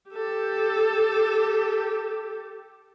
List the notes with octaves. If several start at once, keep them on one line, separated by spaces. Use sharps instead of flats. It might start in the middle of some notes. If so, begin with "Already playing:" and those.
G4 A4